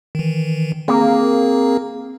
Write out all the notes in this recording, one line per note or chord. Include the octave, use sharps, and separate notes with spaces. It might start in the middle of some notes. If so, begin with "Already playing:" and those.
D#3 E3
A#3 C4 G#4